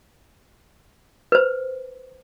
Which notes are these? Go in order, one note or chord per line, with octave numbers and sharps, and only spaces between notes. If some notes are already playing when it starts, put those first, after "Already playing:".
B4 C5